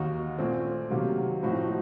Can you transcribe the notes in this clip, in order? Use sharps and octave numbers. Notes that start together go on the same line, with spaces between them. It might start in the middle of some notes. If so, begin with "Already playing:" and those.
Already playing: D#2 D#3 A#3 D#4 F#4
A#2 A3 C4
C3 D#3 F#3 A#3
A2 F3 C4 D#4 F#4